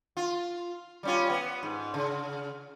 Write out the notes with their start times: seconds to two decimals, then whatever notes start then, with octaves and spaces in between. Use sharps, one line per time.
0.17 F4
1.03 G3 C#4 F4
1.30 B3
1.63 G#2
1.94 C#3